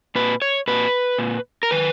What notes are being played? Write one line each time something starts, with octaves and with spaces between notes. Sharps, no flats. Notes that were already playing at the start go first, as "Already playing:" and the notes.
A#2 B4
C#5
A#2 B4
A#2
A#4
D#3 B4